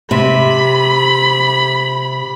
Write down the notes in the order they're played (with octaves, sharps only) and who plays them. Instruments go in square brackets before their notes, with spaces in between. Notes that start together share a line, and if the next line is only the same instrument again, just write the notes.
[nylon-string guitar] C3 [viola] B5